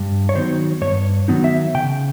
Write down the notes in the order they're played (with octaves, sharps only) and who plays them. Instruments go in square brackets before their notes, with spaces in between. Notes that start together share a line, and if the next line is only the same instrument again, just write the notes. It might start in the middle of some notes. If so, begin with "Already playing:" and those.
Already playing: [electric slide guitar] G2
C#5
D#3 F#3 B3 D#4 C5
G2 C#5
D#3 F#3 B3 D#4
E5
C#3 G5